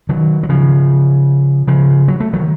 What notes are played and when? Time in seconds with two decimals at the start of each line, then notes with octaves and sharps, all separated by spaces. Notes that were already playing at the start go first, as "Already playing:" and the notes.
0.09 D#3 F#3
0.43 F#3
0.49 C#3 F3
1.67 C#3 F3
2.08 F#3
2.20 A3
2.33 D#3 F#3